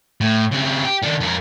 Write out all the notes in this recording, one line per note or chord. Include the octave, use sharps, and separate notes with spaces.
A2
C#3 C4
G4
D#3 D4
F2 A#4